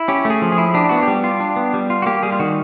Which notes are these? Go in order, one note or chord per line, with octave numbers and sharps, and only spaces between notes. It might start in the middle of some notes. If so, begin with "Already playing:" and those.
Already playing: E4
C#4 G4
A3
G#4
F3
G#4
E4
D4 G4
B3 F#4
G4
G3
F4
D4
B3
G3
F4
F#4
A#3 G4
G3 G#4
F4
D#3 F#4